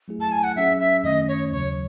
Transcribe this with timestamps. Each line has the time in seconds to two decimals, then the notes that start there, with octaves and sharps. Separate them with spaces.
0.08 F#3 A3 E4 G#4
0.21 A5
0.32 G#5
0.44 F#5
0.56 F#3 C#4 G#4 E5
0.80 E5
1.04 F#2 D#3 A3 C#4 D#5
1.28 C#5
1.52 D#2 C#3 F#3 C#5